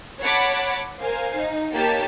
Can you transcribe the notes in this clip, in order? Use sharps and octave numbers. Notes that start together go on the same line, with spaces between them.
C#5 F#5 A5 B5 D6
A#4 C5 F5 G#5
D#4
A#3 D#4 G4 C#5 A5